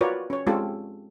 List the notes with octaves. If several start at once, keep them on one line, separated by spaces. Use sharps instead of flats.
F4 F#4 A#4 B4 C#5 D5
C#4 C#5
G#3 C4 C#4 F4 G4 A4